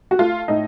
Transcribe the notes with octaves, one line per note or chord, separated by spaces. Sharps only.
F#4
A3 F4
A2 D#4